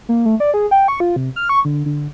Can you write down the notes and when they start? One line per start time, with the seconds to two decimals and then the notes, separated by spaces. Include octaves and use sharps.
0.09 A#3
0.26 A3
0.40 D5
0.54 G#4
0.71 G5
0.88 C#6
1.00 F4
1.16 C3
1.36 F6
1.49 C#6
1.65 D3
1.86 D3